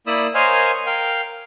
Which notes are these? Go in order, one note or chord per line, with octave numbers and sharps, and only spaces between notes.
A#3 E4 D5 B5 D#6 E6
A#4 C5 C#5 D#5 F5 G#5
A#4 F5 G5